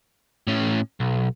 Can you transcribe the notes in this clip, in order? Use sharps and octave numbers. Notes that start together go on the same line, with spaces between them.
A2 C#4
B1